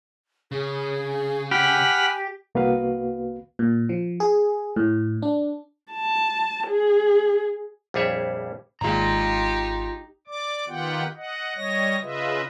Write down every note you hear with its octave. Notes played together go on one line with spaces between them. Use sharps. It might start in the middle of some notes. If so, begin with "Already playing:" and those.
C#3 G#4
G4 F#5 G#5 B5 F6
C2 A#3 B3 F#4 B4 F5
A#2
F3
G#4
A2
D4
A5
G#4
A#1 F2 G3 G#4 C#5 E5
G#1 G#3 D#4 F4 G4 A#5
D5 D6
D#3 B3 F4 G4 F#5 G5
D#5 F#5
G3 C#5 D#5 A#6
C#3 F4 B4 D#5 E5